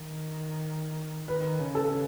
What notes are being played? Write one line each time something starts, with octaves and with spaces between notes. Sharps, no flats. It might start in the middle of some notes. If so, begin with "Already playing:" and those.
Already playing: D#3
D#3 B4
C#3
A4